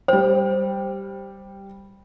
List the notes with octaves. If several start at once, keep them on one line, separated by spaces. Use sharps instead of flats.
G3 C5 G5